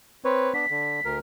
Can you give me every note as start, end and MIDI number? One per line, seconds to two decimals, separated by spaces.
0.25 0.53 60
0.25 0.53 71
0.25 0.53 73
0.54 0.66 59
0.54 0.66 62
0.54 1.16 95
0.70 1.00 50
1.05 1.19 38
1.05 1.19 70